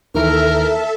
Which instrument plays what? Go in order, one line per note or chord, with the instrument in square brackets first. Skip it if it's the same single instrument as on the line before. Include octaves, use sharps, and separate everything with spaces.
[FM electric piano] D#2 E3 [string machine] A4 E5 [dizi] A#4